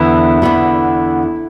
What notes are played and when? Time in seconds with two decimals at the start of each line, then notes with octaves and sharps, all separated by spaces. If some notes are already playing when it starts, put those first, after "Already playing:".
Already playing: E2 D3 B3 E4
0.42 E2 D3 B3